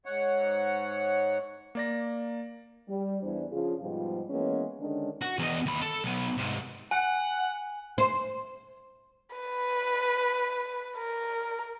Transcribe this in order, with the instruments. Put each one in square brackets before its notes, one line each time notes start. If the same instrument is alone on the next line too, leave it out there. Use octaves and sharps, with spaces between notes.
[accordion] G#2 C#5 F#5
[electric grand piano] A#3 D5 A#6
[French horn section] G3
E2 E3 D4 E4 C5
C#3 F3 F4 G#4
G#2 B2 F3 G3 F4
E3 G#3 A#3 B3 C#4
D3 D#3 G#3 C#4 D4
[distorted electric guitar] F#4
E2 D#5
D#2 B5
A4
B1 B3
G#2 C3
[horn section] F#5 [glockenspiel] G#5
[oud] C5
[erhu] B4
A#4